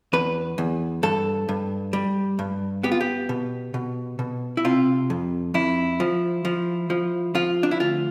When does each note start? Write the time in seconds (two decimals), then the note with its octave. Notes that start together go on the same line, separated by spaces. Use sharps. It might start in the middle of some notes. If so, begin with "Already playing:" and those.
0.13 E2 B4
0.58 E2
1.03 G2 A4
1.49 G2
1.93 G3
2.39 G2
2.83 B3 G4
2.92 F4
3.01 G4
3.29 B2
3.74 B2
4.19 B2
4.57 E4
4.65 C3 F4
5.10 F2
5.54 F2 E4
6.00 F3
6.45 F3
6.90 F3
7.35 F3 F4
7.63 D4
7.71 E4
7.80 D2 F4